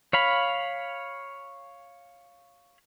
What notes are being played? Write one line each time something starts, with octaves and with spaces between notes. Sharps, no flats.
C#5 F5 B5